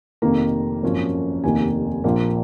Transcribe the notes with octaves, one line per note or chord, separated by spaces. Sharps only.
F1 F2 D#3 A#3 A#5
G#1 F#2 F3 A#3 C#4
F1 D#2 D#3 A#3 G#5
A#1 A#2 F3 A#3